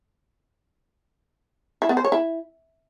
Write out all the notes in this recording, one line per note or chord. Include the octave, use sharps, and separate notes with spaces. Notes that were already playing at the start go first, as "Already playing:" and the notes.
E4
B3
C5
C#5
E4